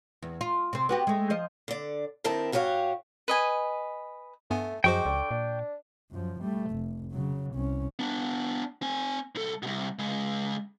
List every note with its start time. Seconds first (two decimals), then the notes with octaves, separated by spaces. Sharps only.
0.22 E2
0.41 F4
0.73 C3 C4
0.89 B3 F#4 G4
1.07 G#3 A3
1.30 F3 C5 D#5
1.68 D3 D5
2.24 G2 D#3 C4 E4 A#4 A5
2.52 G#2 F#4 G4 C#5 F5
3.28 B4 D#5 G#5
4.50 G2 A3 B3 G#5
4.84 F#2 F3 G#3 F#4 C5 G5 C#6 D6
5.06 C#2 D3
5.31 A#2 D4
6.11 F#2 F3
6.42 G3 A3
6.72 F1
7.12 C#3 F#3
7.55 C2 C#4
7.99 B3 D4
8.82 C4 G#5
9.35 C2 A4
9.63 C2 B2
9.99 C#3 G#3